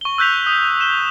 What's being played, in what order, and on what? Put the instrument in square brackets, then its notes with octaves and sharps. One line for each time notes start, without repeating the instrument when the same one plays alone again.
[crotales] C#6 G7
E6 F#6 G6 B6 F7
D#6
E7 G7